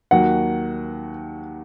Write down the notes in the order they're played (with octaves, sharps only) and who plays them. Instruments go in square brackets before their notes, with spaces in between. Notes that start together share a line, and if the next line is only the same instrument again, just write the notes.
[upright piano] D#2 D#3 F#3 F#5